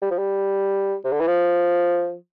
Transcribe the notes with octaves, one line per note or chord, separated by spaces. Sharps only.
G3
F3
G3
C3
D3
E3
F3